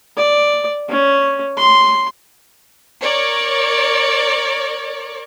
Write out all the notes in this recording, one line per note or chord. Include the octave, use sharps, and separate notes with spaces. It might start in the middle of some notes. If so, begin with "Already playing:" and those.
D5
C#4
C6
A#4 C#5 D5